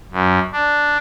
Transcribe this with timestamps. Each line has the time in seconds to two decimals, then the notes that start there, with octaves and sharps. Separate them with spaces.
0.12 F#2
0.53 D4